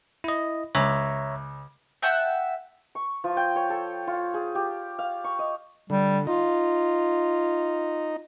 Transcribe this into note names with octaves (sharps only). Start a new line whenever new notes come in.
E4 D#5
C#2 C#5 E5 A#5
E5 F#5 G5 A5
C#6
F3
G5
C#5
A4
F4
G#4
G4
F5
C#6
D#5
D3 G3
D#4 F4